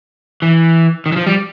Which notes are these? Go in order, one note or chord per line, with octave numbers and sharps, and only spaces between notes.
E3
D#3
E3
F3
G3